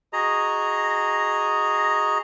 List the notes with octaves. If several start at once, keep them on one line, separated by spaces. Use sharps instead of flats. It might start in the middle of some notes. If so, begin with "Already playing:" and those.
F#4 G#4 D#5 A#5